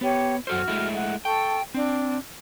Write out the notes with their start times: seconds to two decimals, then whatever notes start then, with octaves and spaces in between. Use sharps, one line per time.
0.01 B3 G4 C#5
0.47 F#2 F#4 A4 C5 F6
0.68 G#3 A3 E4
0.95 F#5
1.25 A4 G5 A5 C#6
1.74 C4 D4